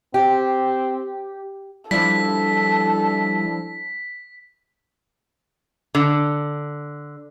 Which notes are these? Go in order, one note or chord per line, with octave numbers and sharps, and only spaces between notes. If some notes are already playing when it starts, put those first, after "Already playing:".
C4 G4
F3 G3 D4 E4 A4 B6
D3